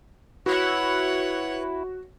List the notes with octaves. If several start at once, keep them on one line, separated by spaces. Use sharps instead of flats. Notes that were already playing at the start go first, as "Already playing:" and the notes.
E4 F#4 B4 C#5 F#5